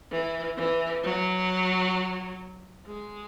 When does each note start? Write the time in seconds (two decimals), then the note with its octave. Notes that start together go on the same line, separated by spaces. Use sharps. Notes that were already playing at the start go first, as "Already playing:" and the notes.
0.11 E3
0.57 E3
1.03 F#3
2.86 G#3